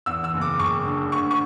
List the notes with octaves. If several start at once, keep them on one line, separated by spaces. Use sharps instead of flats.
E2 E6
E6
F#1
D6
F#1 C#6
D3
D2 C#6
C#6